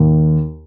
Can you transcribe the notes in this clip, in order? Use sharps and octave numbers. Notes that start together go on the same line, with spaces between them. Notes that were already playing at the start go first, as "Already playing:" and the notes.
Already playing: D#2